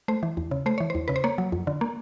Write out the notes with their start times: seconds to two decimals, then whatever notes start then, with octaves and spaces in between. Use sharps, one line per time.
0.08 A3 C5
0.23 E3
0.37 E2
0.51 C#3
0.66 A3 C5
0.78 E3 C#5
0.90 E2 C5
1.08 C#3 B4
1.16 C5
1.24 A#3 C#5
1.38 F#3
1.52 F2
1.67 D3
1.81 A#3